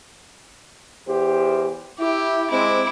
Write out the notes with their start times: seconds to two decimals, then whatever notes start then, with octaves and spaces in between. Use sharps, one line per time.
1.07 E2 G4 C5
1.99 E4 G4
2.51 G#3 C4 E4 D6